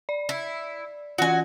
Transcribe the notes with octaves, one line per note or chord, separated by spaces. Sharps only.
D5
E4
E3 F4 F#4 G#5